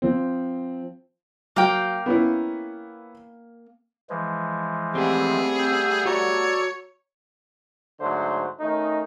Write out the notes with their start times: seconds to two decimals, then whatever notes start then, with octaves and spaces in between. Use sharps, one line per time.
0.02 F3 C4
1.56 F#3 A#3 F5 G5
2.06 B3 C#4 E4
4.10 E3 F3 G#3
4.95 G3 A3 B3 C4 G#4
5.59 E6 G6
6.05 F#4 A4 C#5 D5 A#5
8.00 G#2 D3 F#3 A3 C5
8.60 D#3 A3 C#4 D#4